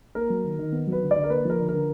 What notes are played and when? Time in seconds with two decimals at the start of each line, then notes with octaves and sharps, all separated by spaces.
0.15 A#3 A#4
0.30 F#3
0.44 D#3
0.59 D#3
0.72 B3
0.87 F#3
0.92 B4
1.02 D3
1.11 D5
1.16 D3
1.24 A#4
1.30 A#3 B4
1.45 F3 A#4
1.59 D3
1.69 A#4
1.74 D3